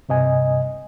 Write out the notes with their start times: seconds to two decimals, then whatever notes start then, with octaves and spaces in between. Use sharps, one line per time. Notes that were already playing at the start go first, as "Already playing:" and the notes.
0.09 G2 C3 D#5 G#5